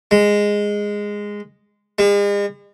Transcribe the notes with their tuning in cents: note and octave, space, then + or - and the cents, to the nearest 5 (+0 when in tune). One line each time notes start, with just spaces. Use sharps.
G#3 -10
G#3 -45